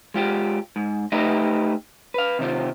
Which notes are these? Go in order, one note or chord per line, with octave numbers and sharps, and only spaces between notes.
G#3 F4 G4
G#2
A3 D#4 G4 B4 D#5 E5
B4 F5
C3 D#3 C4 F4